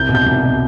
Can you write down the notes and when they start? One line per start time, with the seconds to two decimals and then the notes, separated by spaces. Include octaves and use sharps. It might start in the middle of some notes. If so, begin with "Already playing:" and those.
Already playing: C2 G6
0.09 B2
0.15 G6
0.26 C2
0.43 B2